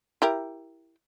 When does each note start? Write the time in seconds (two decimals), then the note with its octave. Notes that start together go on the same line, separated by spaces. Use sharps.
0.22 E4 G4 A#4